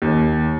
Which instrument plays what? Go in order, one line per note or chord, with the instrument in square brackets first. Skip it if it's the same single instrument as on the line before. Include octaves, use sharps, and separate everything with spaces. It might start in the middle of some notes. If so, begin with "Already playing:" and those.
[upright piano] D#2